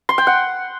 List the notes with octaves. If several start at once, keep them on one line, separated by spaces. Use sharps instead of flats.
C6
G5
F#5